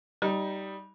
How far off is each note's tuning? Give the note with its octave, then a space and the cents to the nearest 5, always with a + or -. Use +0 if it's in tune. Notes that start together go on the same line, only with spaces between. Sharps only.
G3 -10 D#4 +0